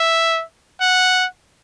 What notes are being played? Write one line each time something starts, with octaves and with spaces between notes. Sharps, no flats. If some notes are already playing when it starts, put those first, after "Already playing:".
Already playing: E5
F#5